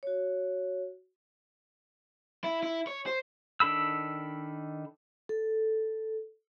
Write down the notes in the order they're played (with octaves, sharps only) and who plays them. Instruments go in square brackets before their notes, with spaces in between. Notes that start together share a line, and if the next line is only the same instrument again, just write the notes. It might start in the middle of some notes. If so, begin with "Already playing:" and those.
[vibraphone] F#4 C#5
[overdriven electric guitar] E4
E4
C#5
C5
[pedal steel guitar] D#3 D4 A4 B5 E6
[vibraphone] A4